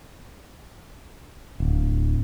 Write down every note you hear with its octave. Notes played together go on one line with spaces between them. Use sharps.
D1